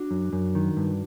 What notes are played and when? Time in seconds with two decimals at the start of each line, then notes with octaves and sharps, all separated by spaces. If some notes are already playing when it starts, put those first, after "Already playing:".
Already playing: D4 F#4
0.11 F#2
0.33 F#2
0.55 D#3
0.77 G2